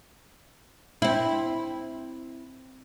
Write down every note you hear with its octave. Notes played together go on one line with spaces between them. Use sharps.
C4 E4